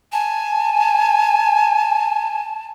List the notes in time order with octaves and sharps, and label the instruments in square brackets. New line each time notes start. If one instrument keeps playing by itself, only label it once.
[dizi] G#5 [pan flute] A5